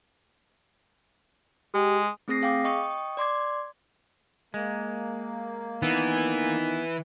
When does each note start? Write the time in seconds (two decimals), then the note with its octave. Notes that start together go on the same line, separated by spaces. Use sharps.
1.74 G#3 G4
2.28 A3 C4 G#4 D#6 A#6 C7
2.42 G#4 F5 G5 D6 D#6
2.64 D#5 G5 C#6 D#6
3.17 D5 C6 D6 G#6
4.54 G#3 A#3
5.82 D#3 E3 B3